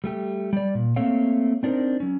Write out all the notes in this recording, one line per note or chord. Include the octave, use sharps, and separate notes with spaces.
G3 A3 G4
G3 D5
A#2
A3 A#3 C4 C#5 F5
C4 D4 D#4 A#4 C5
F#3 C#4